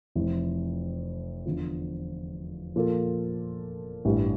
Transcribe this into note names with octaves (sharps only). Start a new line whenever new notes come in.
F1 F2 E3
E2 D3 F3
A#2 F3 A#3 F4 A4
A1 G2 E3 G3